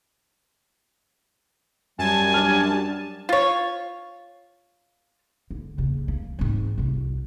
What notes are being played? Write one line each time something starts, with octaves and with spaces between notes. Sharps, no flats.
F#2 G3 G#5 A5
D4 F6
F4 C#5
D3
D#2 C#3
A#3
G#2 C4
G1 C2